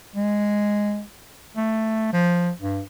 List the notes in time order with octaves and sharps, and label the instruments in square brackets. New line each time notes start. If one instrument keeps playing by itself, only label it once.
[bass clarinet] G#3
A3
F3
G2